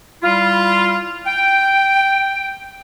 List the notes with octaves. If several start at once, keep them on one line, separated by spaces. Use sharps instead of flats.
G3 E4 F4
G5